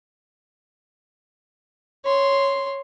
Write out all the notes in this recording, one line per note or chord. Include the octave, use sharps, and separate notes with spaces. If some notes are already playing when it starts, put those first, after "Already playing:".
C#5 C6